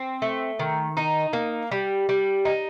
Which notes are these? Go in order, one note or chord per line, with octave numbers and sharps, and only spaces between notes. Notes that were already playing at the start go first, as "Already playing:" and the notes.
Already playing: C4
A3
D#3
D#4
A#3
G3
G3
D#4